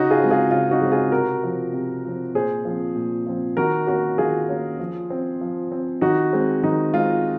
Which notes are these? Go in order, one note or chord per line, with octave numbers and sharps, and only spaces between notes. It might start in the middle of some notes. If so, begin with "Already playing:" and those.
Already playing: C#3 D#4 F#4
F4 G#4
G#3 C4
F4 G#4
C#3 F4
D#4 F#4
G#3 C4
F4 G#4
C3 F#4 A#4
F3 C4
C3
F3 C4
A#2 G#4 C5
F3 C4
A#2
F3 C4
D#3 F#4 A#4
A#3 C#4 F#4 A#4
D#3 F4 G#4
A#3 C#4
F3
C4
F3
C4
D#3 D#4 F#4
G#3 C4
D#3 D#4
G#3 C4 F4